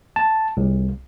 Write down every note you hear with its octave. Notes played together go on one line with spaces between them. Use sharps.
A5
C2